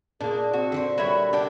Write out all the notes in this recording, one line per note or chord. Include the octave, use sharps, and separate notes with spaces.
A#2 A#3 D4 G#4
C4 F#4
D3 D4 C5
G3 A#3 F#4 C#5 E5 B5
D4 D5 F#5 G5